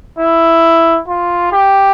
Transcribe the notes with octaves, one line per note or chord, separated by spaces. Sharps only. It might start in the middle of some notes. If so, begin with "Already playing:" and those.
E4
F4
G4